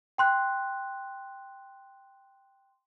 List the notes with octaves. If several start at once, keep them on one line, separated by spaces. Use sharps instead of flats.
G5 C6 F#6